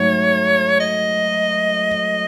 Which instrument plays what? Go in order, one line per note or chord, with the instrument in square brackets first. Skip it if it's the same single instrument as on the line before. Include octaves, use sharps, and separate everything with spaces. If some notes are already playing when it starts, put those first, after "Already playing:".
Already playing: [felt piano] G#2 F#3 A3 [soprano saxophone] C#5
[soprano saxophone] D#5